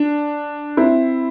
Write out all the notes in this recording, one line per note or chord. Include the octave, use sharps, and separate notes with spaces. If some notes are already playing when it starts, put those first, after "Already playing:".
Already playing: D4
C4 E4